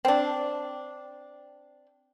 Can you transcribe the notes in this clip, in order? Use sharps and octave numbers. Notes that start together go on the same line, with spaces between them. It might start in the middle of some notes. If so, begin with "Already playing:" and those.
C4 D4